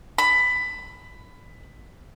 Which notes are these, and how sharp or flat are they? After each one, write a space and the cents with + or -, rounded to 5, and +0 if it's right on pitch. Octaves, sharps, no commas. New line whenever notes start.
B5 +15